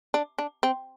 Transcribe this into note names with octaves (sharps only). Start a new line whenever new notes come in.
D4
D4
C4